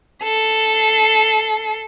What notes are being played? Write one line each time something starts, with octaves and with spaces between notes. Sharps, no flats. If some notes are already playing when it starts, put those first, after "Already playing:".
A4 C7